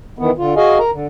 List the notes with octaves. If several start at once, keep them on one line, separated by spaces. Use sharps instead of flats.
D#3 E3 B3
D3 F4
F#4 G#4 D#5 F5 G#5
A#4 A#5
D3